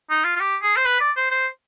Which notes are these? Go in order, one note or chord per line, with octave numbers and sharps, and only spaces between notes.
D#4
F4
F4
G4
G#4
C5
B4
D5
C5
C5